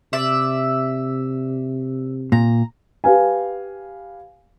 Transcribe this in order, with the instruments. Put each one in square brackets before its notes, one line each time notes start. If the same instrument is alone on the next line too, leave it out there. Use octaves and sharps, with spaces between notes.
[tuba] C3 [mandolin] D5 E5
[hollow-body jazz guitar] A#2 [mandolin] A#5
[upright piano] G4 B4 F5 G#5